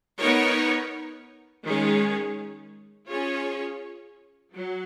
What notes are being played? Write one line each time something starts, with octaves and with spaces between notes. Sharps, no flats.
B3 D#4 A#4 C#5
D#3 G#3 C#4 G#4 C#5
C#4 F4 G#4 C#5
F#3